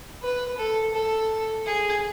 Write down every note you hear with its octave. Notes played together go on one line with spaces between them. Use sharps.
B4
A4
A4
G#4